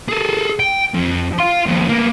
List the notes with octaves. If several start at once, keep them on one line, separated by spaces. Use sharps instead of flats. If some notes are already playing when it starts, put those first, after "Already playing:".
G#4 A4
G5
F2
F5 C6
D#2 F3
A#3 B3